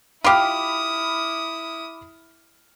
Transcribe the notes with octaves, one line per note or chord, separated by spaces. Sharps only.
E4 F4 G4 B5 D6 D#6 F6